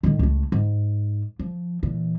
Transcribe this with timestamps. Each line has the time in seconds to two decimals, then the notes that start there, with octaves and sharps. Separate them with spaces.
0.03 A2 D#3
0.19 C#2 A3
0.52 G#2
1.39 F3
1.83 A#2 E3